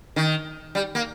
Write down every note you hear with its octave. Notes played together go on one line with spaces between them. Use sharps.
D#3
G3
A#3